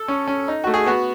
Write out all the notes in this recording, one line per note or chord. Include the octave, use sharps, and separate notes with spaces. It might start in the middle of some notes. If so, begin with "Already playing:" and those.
Already playing: A4
C#4
C#4
D#4
A3 F#4
G#4
B3 F#4